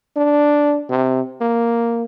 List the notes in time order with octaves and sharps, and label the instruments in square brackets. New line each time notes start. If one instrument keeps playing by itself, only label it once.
[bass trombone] D4
C3
A#3